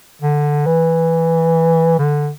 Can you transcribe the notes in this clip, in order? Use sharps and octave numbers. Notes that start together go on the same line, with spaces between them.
D3
E3
D3